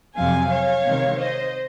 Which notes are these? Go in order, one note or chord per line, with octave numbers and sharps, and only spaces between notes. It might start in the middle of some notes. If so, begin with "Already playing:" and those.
F2 C3 F#3 C4 F5 G#5
C#5 F5
C3 D#3 G#3 C4
C5 D#5